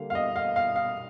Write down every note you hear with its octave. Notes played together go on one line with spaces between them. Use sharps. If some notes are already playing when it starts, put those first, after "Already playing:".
Already playing: D3 G3 A#3 F5
F5
D#5
F5
F5
F5